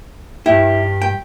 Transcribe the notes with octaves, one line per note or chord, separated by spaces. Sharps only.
G2 E4 G4
G5